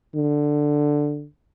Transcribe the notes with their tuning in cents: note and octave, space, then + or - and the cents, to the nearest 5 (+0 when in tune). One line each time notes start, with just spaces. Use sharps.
D3 +5